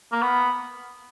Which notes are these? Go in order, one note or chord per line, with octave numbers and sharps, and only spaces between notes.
A#3
B3